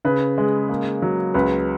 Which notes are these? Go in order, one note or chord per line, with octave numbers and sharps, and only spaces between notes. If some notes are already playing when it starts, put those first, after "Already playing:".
C#3 B4
G#3
A#3
F#3
C#2 B4